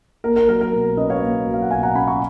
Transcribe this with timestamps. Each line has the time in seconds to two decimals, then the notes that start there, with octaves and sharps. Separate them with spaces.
0.24 A#3 A#4
0.36 A#4
0.49 F#3 A#4
0.61 A#4
0.73 B2
0.97 C#4 B4 D#5
1.10 C#5 F5
1.22 A#3
1.46 F#3
1.54 F5
1.62 F#5
1.70 B2 F5 G#5
1.83 F#5 A#5
1.95 C#4 G#5 B5
2.07 A#5 C#6